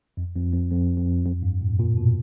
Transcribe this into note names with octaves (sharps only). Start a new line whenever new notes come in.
F2
F2
F2
F2
F2
F2
G2
A2
A#2
B2